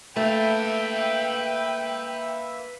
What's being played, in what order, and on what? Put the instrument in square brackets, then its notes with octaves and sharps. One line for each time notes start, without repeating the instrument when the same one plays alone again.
[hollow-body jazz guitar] A3 [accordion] A#3 E5 [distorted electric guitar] B4 F5 [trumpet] G5